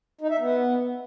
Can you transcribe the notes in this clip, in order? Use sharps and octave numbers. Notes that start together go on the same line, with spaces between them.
D#4
E5
B3